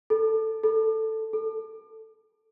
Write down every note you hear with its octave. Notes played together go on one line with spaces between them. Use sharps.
A4
A4
A4